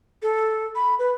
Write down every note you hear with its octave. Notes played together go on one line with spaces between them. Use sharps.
A4
B5
B4